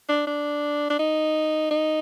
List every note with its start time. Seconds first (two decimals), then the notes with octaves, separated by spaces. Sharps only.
0.09 D4
0.27 D4
0.90 D4
0.99 D#4
1.71 D#4